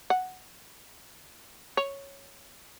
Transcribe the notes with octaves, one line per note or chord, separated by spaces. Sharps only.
F#5
C#5